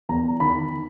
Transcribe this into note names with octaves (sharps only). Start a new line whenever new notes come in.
E2 A#5
D#3 B5